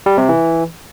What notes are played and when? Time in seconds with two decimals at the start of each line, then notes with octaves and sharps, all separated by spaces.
0.06 G3
0.18 C3
0.29 E3